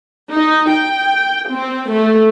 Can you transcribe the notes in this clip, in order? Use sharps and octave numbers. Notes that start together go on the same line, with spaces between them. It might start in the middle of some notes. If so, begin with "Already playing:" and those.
D#4
G5
C4
A3